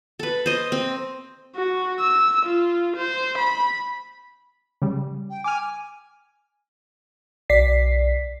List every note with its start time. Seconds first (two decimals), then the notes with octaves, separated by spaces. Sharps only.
0.19 A4 B4
0.46 C5 D#5
0.72 C4
1.56 F#4
2.00 E6
2.46 F4
2.97 C5
3.38 B5
4.82 C#3 G3
5.30 G5
5.44 G#5 D6 F6
7.49 B1 D5 B6 C7